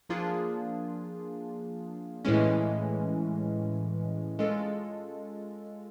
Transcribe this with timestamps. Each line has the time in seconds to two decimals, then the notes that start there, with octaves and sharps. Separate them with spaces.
0.09 F3 A#3 D4 F4 G#4
2.25 A2 E3 G#3 C#4
4.39 G#3 C#4 F4 A4